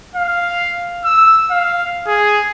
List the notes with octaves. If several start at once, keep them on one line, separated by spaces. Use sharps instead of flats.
F5
E6
F5
G#4